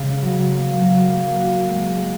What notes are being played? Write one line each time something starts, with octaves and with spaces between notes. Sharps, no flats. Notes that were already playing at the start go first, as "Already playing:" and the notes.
Already playing: C#3 G#3 C#4
F#3
A#3
F#3
A#3
F#4
G#3
G#3